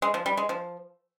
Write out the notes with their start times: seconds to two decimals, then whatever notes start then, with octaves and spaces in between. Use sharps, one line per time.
0.02 G#3
0.14 F3
0.26 G3
0.37 G#3
0.49 F3